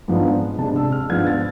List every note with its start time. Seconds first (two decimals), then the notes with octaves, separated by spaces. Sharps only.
0.08 G#2 F3 B3 D4
0.58 C3 G#3 D4 A5
0.76 E6
0.92 F6
1.09 G#2 F3 B3 D4 G#6
1.27 A6